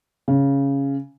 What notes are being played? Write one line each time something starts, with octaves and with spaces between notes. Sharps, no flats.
C#3